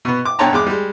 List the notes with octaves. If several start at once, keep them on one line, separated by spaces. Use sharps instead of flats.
B2 B3
D6
B1 G2 C#5 G5 A5 A#5
E2 G#3 D6
G3 G#3